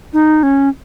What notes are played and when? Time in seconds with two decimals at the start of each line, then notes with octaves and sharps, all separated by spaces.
0.13 D#4
0.43 C#4